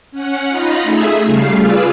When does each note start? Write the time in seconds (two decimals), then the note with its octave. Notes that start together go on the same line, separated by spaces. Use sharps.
0.11 C#4 F#5
0.49 D#4 F4 A#5 B5
0.83 A3 G#4 E5
1.25 C#3 G3 A3 F5 C7
1.56 F4 G#4 B4 D5 F5 E6